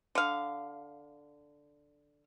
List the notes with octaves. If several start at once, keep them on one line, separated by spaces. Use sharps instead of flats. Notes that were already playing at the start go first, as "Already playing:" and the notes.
D3 F5